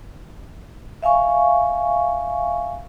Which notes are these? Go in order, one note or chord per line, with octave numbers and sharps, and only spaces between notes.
E5 F5 G#5 C#6